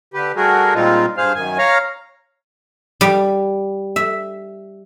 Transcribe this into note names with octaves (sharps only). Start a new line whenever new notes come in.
D3 G4 B4
G3 A3 F#4 G#4 A#4
A#2 G3 G#3 C4 D#4 F4
G2 G#4 C5 F5 F6
F#2 D#3 G#5
C#5 F5 A#5 F6
G3
E5